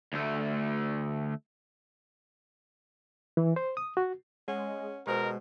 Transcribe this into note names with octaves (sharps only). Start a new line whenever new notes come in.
D2 A3
E3
C5
D#6
F#4
G#3 C#4 F#5
B2 G#3 G4 A#4 C5 D5